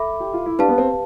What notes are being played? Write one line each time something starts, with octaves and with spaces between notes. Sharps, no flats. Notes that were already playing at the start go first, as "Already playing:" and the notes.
Already playing: A4 E5 B5 D6
G4
F4
E4
D4 G4 B4 F5 A5
B3
C4